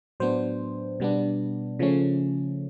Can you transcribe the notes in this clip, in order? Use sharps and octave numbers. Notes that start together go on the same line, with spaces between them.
A2 F#3 B3 D4 C5
B2 G3 B3 D4
C#3 F3 A3 C#4